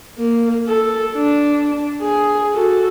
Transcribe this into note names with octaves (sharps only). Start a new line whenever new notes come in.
A#3
A4
D4
G#4
F#4 A4